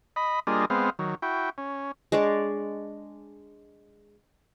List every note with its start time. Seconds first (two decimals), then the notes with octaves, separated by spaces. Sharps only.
0.16 D#5 B5
0.47 G3 A#3 D4 F4 G#4 D#5
0.70 G#3 B3 C4 F5
0.99 D#3 F#3
1.22 E4 F#4 G5
1.58 C#4
2.12 G#3 D4 C#5 D5